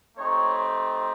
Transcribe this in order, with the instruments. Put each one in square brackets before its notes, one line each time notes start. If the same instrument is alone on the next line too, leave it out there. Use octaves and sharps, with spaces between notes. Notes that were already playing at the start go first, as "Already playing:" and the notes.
[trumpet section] A3 C4 D#4 G4 C#5